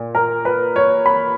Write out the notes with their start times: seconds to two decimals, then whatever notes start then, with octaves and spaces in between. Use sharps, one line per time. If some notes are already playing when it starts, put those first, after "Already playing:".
Already playing: A#2
0.15 A#4
0.45 B4
0.76 C#5
1.06 B5